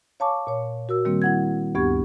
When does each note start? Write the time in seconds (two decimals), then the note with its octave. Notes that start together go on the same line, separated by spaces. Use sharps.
0.20 C#5 F5 G#5 A5 C#6 D6
0.47 A#2 C#5
0.89 F#4 A#4 E6
1.05 D#3 G3 A#3 C4
1.22 E4 F#5 G#6
1.75 D2 G2 B3 G4 C#6 G#6